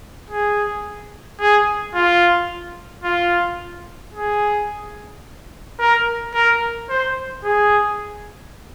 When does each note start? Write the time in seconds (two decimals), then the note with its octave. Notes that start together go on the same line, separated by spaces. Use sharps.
0.30 G#4
1.40 G#4
1.95 F4
3.04 F4
4.15 G#4
5.79 A#4
6.34 A#4
6.90 C5
7.44 G#4